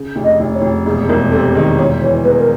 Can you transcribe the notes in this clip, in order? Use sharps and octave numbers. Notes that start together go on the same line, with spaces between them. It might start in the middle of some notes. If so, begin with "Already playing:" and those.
Already playing: C#3
F1
D#5
F1
C#5
F1
E1 G#4
E1 A#4
C3 A4
D#3 G#4
E1 C#5
E3 C#5
E2 B4
A#4